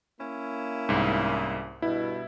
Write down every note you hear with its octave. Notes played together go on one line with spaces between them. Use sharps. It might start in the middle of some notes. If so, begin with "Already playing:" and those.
A#3 C#4 E4
C2 G#2
G2 B2 E4